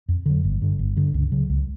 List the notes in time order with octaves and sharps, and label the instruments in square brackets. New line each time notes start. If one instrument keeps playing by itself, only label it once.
[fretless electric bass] F2
D3 F#3
G1
G2 D3
G1
G2 D3
C#2
C#3 F#3
C#2